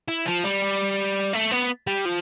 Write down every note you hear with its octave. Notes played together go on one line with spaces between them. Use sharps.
E4
F3
G3
A3
B3
G3
F3